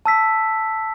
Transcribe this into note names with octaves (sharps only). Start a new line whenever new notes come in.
A5 E6 B6